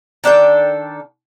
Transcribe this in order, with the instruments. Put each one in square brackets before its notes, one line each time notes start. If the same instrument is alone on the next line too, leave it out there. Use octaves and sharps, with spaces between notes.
[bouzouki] D#3 D4 A4 G5